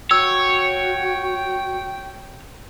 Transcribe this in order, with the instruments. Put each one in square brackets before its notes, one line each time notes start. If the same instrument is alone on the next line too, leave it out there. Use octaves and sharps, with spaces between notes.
[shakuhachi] F#4 [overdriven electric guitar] C#5 [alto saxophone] G5 [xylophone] E6